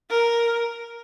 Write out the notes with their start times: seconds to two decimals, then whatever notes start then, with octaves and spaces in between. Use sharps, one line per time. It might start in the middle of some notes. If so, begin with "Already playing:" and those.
0.10 A#4